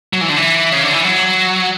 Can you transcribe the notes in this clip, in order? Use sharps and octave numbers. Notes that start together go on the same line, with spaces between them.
F#3
E3
D3
E3
C#3
D3
E3
F#3